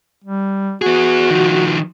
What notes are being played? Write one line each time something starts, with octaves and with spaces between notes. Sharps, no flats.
G3
B3 F#4 G#4
D#3 F3